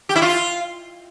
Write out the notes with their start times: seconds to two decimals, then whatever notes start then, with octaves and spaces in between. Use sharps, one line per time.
0.09 G4
0.16 E4
0.22 F4